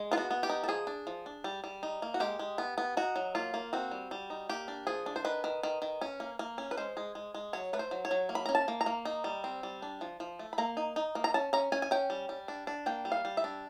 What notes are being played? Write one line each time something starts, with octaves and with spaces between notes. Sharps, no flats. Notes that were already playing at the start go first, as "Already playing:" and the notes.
Already playing: G#3
B3 F4
F#4
B3
G4
D#4
A4
F3 G#4
D4
F3
D4
G3
G3
D#4
A#3
F#4
G#3 G4
G#3
B3
B3
D#4 F#4
F#3
A#3 F4
A#3
C4 F#4
G3
G3
D#4
A#3 G4
D4
F3 G#4
D4
C5
D#3 B4
D#3
D#3
D#3
C#4
A#3
A#3
C#4
B4
G#3 C5
G#3
G#3
G#3
F#3 C#5
A3 B4
C5
F#3
C#5
F#3
A#3
B5
C#4 A#5
A5
A#3
A#5
A#3
D#4
G3
C4
G3
D4
F3
F3
A3
B5
A#3 A#5
D#4
D#4
A#3
A#5
C#4 A5
C#4 A#5
C#4 G#5
G#5
C#4 G5
G3
G3
D4
D4
A#3 G5
G3
F5
G3
E5
D4